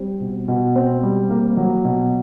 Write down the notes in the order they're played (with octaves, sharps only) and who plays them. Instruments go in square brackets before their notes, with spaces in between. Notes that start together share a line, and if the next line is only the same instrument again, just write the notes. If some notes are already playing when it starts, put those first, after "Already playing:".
Already playing: [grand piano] G3 C4
B2
B2
C4
G3
A#3
F#3
B2